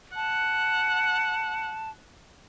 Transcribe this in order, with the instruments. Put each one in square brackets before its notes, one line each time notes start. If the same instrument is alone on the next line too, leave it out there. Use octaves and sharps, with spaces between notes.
[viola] F#5 [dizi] A5